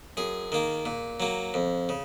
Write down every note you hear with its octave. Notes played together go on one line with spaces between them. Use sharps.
F#2 G#4
D#3 A#3
A#2
F#3 A#3
F2
C#3